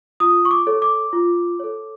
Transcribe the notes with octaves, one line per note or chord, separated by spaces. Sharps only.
F4 D#6
C#6
D6
A4 C#5
D6
F4
A4 C#5